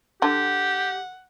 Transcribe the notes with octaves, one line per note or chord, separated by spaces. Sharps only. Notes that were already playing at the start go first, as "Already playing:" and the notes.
D3 G4 F#5